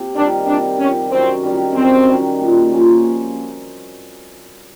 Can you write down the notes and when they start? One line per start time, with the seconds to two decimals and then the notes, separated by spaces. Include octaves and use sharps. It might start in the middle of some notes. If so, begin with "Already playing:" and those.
Already playing: C3
0.15 D#3 G3 D4
0.47 C3 D4
0.79 D#3 G3 C#4
1.11 F#2 C4
1.43 D#3 G3
1.75 F#2 C4
2.07 D#3 G3
2.39 A#2
2.71 F3 A#3 C#4